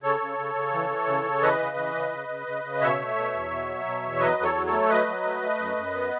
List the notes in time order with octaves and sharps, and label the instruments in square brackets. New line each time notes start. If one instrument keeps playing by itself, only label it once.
[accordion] C#3 A4 C#5
C#3
C#3
C#3
E3
E3
C#3
C#3
E3 B4 D#5
C#3
E3
C#3
C#3
C#3
C#3
C#3
B2 C#5 E5
A3
B2
E2
B2
F#3
B2
E2
F#3 B4 D#5
E2
A4 C#5
F#3
A4 C#5
A3
F#3 B4 D#5
F#3
A3
A3
F#2
F#2
B3